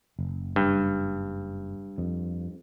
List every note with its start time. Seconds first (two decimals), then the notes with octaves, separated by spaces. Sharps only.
0.19 F#1
0.56 G2
1.98 F2